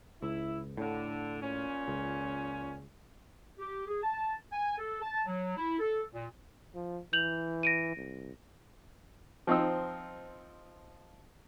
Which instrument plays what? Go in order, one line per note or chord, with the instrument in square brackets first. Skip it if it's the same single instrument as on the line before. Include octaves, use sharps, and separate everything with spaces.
[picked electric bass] C#2 [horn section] E4
[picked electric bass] A2 [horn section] D3
[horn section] A#2 C#4
[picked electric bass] C#2
[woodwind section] G4
G#4
A5
G#5
A4
A5
F#3
E4
A4
A#2
[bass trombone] F3
[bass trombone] E3 [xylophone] G6 F7 F#7
[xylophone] A#6 D7 D#7
[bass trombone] C2
[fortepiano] F3 C4 D#4 E6